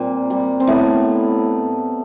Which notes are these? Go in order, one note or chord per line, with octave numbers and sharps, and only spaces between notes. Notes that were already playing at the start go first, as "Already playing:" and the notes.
Already playing: A#2 G3 A#3 C4
G3
C4
A2 A3 B3